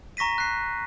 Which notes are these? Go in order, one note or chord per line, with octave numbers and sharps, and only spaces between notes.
A#5 C#6 A#6 B6 D#7
F#6 C7